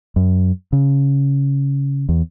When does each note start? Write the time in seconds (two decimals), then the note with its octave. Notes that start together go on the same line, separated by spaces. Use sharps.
0.16 F#2
0.73 C#3
2.09 E2